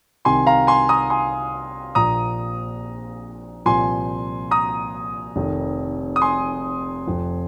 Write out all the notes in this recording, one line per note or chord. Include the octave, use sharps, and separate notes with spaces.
C2 C3 D#3 G#5 C6
F5 A#5
G#5 C6
A#5 D#6
G#5 C6
A#1 A#2 F3 A#5 D#6
C2 A#2 F3 G#5 C6
A#5 D#6
F1 F2 D#3
D#6
G#5 C6
F1 F2 F3